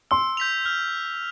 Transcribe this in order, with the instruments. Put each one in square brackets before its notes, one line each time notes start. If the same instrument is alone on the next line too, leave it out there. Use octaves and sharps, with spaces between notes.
[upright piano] C6 [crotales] E6
[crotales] G6 B6 F7
F6